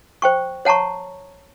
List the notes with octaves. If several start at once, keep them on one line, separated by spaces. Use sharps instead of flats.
C5 G5 C#6
C#5 F#5 A5 A#5 C#6